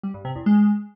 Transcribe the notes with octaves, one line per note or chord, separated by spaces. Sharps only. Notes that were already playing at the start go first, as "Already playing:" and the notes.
G3
G2
C3
E2
G#3